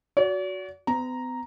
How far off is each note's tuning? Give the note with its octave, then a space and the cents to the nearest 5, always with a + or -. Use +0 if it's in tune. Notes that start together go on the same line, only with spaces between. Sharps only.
F#4 +0 D5 -45
B3 +45 A#5 +0